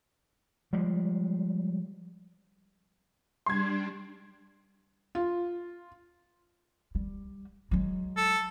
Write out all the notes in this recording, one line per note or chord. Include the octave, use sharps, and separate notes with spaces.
F3 G3 G#3
G3 D4 C6 G#6
F4
G3
F#3 G#3
A4